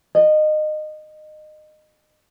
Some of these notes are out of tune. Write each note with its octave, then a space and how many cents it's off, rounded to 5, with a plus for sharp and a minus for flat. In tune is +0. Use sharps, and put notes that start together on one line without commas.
D#5 -25